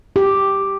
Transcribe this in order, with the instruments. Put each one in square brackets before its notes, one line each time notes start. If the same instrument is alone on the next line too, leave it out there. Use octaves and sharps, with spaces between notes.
[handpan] G4